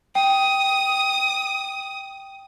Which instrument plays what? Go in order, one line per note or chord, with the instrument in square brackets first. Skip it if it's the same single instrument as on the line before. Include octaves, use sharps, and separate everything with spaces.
[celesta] G5 [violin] D#6